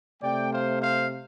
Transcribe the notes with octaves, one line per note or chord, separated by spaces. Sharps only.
C3 A3 D5 G5
C5 F5
C5 F5